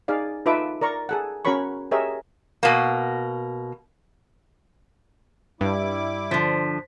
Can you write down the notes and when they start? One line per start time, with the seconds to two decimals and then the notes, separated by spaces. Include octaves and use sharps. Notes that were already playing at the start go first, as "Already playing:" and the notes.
0.08 D#4 G#4 D5 F5
0.46 D#4 F4 A4 B4 E5 D6
0.81 A#4 D5 A#5 C#6
1.09 G#4 A4 F#5
1.45 C#4 F#4 A#4 C#5 B5 C#6
1.91 G4 G#4 A#4 C#5 D#5 E5
2.63 B2 A#3
5.61 G2 G3 E4 D6
6.31 D3 F3 C5 B6